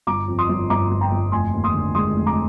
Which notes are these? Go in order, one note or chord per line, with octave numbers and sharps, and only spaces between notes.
G1 A#5 D6
F2
C6 D#6
G1
G1 A#5 D6
G1
G5 A#5
G1
F1 G#5 C6
D#2
C6 D#6
D3
G#3 C6 D#6
F1
A#5 D6